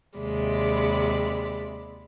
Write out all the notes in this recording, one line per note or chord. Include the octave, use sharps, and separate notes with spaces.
D#2 C3 G#3 D5 B5